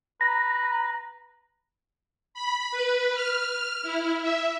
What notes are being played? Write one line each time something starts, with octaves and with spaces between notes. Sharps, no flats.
B4 A#5
B5
B4
F6
E4
E5